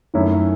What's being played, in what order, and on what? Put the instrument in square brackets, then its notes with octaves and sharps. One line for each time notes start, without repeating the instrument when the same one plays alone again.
[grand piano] F#2 D#3 A3 C#4 E4